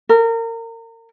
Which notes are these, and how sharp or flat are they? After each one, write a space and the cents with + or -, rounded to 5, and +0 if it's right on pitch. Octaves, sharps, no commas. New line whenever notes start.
A#4 -30